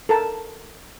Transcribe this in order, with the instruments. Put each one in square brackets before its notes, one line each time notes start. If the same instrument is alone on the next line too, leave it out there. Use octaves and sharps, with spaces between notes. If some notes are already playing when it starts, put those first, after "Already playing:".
[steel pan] A4 A#4 A5